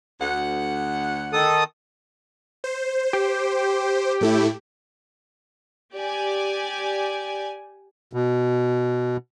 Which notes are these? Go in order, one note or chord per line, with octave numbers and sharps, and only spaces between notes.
D2 F#5
D#3 A4 D#6
C5
G4
A2 A3 E4
G4 D5 G#5
B2